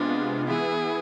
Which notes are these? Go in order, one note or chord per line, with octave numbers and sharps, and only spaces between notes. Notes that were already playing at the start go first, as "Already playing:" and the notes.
Already playing: C3 G#3 B3 D4 F4
E3 B3 E4 G#4